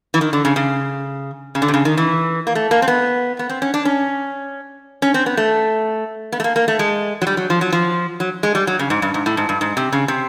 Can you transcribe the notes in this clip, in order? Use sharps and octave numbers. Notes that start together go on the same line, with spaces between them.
E3
D#3
D3
C#3
C#3
C#3
D3
C3
C#3
D#3
E3
A#3
A3
A#3
C4
B3
B3
C4
C#4
D4
C#4
C#4
C4
B3
A3
B3
A3
A#3
A#3
A3
G#3
F#3
G3
F#3
F3
F#3
F3
F#3
G#3
G3
F#3
C#3
G#2
G2
G#2
A2
G#2
G2
G#2
C3
C#3
C3